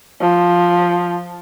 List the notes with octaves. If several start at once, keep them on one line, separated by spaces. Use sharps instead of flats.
F3